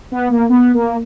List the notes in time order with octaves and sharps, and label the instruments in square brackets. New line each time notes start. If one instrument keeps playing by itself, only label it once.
[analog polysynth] B3
A#3
B3
A#3